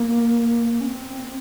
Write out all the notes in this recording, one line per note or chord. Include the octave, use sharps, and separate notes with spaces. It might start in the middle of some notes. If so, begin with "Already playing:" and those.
Already playing: A#3
C#4
C4